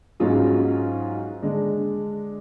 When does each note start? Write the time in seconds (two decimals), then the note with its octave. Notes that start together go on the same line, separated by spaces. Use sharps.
0.20 G#2 F#3 C#4 F4 G#4
1.42 D3 G#3 D4